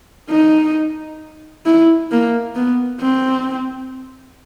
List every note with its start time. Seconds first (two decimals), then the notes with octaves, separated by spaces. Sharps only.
0.30 D#4
1.66 E4
2.11 A#3
2.55 B3
3.01 C4